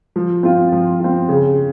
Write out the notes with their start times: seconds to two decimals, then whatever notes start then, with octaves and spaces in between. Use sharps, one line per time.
0.16 F3
0.43 C4 F4
0.72 F3
1.00 C4 F4
1.29 C#3